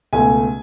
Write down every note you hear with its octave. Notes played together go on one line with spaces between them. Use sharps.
C#2 B2 A3 G#5